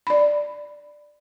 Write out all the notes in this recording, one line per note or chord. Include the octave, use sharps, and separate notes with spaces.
D5 B5